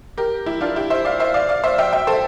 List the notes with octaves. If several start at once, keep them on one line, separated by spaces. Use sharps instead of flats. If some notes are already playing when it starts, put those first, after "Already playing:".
G4 A#4
E4 G4
D4 F4
E4 G4
C5 E5
D5 F5
C5 E5
D5 F5
D5 F5
C5 E5
E5 G5
E5 G5
A4 C5